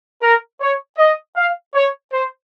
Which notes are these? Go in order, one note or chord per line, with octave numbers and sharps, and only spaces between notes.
A#4
C#5
D#5
F5
C#5
C5